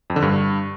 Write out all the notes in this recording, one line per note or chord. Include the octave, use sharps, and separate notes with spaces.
F2
D3
G2